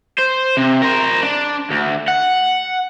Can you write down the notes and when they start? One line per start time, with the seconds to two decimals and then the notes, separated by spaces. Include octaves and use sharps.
0.19 C5
0.57 C3
0.82 A#4 C5
1.23 D4
1.71 D2
2.08 F#5